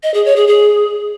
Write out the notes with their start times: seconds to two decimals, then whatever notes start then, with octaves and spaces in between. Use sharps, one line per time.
0.03 D#5
0.14 G#4
0.25 C#5
0.36 G#4
0.47 G#4